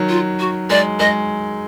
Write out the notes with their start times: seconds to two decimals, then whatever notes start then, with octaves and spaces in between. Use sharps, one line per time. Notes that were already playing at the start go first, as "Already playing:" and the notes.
Already playing: D#3 F#3
0.09 F4
0.40 F#4
0.70 G#3 D5
1.00 G#3 D#5